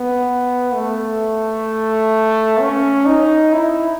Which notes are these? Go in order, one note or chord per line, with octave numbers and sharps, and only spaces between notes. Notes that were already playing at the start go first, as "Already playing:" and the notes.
Already playing: B3
A3
C#4
D#4
E4